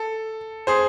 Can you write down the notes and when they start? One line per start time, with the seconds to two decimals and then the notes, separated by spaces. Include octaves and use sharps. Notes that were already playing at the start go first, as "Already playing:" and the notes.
Already playing: A4
0.67 G#4 C5